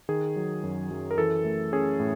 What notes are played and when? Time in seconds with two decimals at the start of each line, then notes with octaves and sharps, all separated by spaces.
0.09 D#3 G#4
0.36 F#3
0.63 F#2
0.90 F#2
1.11 A#4
1.18 E3 A4
1.45 A3
1.73 C#4 G#4
2.00 A2